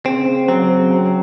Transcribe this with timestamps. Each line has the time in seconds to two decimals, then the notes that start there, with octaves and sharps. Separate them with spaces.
0.06 C#3 C4
0.28 C#3
0.48 F#3 C4
0.70 C#3
0.91 F#3